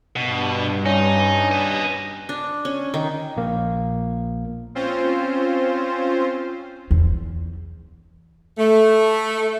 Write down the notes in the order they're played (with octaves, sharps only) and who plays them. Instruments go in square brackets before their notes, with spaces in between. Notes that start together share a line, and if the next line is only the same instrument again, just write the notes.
[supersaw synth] G2 [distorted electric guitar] B2
[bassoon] C#4 [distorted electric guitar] D#4
[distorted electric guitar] B4 D#5
[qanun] D4
C#4
D#3
[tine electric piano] A#1 A#3
[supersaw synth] C4 C#4 F4 C5
[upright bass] E2
[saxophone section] A3